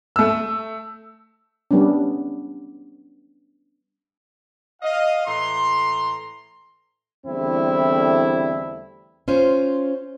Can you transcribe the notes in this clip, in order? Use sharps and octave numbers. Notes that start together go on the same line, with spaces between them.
A3 E6
G3 B3 C#4 D4
D#5 F5
A2 E3 A#5 C6
E2 D3 G3 A3 C4 E4
C#4 F4 C5